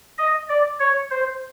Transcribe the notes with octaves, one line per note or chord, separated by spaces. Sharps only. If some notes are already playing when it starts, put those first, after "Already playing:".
D#5
D5
C#5
C5